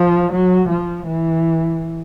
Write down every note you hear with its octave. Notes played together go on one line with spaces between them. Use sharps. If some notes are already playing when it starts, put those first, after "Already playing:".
Already playing: F3
F#3
F3
E3